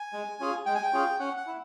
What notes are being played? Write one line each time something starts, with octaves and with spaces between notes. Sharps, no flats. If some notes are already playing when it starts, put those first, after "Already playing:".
Already playing: G#5
G#3
C#4 F4 G#4
G#3 G5
G#5
G5
C#4 F4 G#4
C#4 F#5
F#5
E4